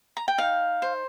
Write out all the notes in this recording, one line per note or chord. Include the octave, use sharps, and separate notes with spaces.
A#5
G5
D#4 F5
C5